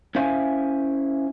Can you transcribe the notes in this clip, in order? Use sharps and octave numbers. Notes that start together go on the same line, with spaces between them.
C#4 E4 C5 E5 F5 G#5